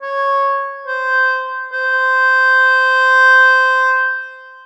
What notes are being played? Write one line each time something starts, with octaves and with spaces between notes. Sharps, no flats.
C#5
C5
C5